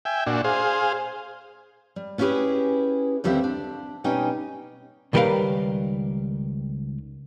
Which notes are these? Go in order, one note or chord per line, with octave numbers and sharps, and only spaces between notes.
E5 G5 G#5
A#2 D4 F#4
G#4 C5 F5
G3
B3 C#4 E4 G4 G#4 B4
D#2 D3 G3 C4 C5 E5
D4
B2 G3 C#4 D#4 G5 G#5
C#2 D#3 G3 A#4 B4 F5